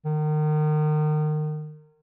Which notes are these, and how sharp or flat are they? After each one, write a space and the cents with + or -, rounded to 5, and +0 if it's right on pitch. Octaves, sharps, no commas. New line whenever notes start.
D#3 -30